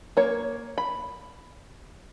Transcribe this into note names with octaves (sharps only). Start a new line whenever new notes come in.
A#3 C#5
B5